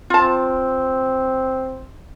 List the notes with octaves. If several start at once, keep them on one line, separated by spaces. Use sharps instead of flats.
C4 F4 A5